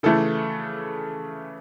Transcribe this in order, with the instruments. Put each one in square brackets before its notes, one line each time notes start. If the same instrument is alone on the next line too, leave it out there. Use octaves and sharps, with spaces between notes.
[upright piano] C#3 E3 A3 A4